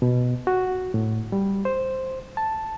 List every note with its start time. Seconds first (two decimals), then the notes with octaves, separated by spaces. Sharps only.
0.02 B2
0.47 F#4
0.94 A2
1.32 G3
1.65 C5
2.37 A5